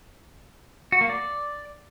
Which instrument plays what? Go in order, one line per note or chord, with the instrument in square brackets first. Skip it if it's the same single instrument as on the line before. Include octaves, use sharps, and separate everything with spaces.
[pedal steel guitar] F#4
A#3
D5